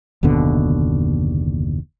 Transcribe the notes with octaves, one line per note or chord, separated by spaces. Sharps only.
F#1 D#2 B2 D3